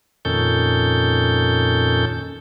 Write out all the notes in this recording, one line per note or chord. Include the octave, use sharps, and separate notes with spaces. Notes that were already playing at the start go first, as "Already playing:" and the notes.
F2 A#2 D#3 C#4 A4 G6